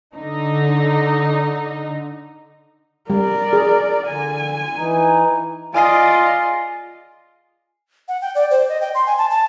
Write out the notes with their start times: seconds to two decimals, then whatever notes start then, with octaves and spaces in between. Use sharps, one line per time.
0.17 D3 D#4
3.10 G3 A#4 D5
3.53 G#4
4.08 D3 G#5
4.76 E3 D#4
5.74 F4 G#4 D5 D#5 F5 G#5 D#6 C7
8.08 F#5
8.22 G5
8.35 D5
8.51 C5
8.69 D#5
8.81 G5
8.95 C6
9.06 G#5
9.18 A5
9.30 A5